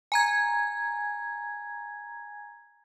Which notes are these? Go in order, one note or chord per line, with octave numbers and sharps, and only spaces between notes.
G#5 A#5 G#6